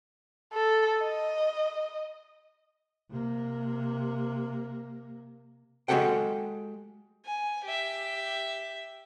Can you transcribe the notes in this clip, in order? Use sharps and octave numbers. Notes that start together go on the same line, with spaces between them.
A4
D#5
C3 A#3
G#3 F#4 G4 A4 F#5 G5
G#5
G4 E5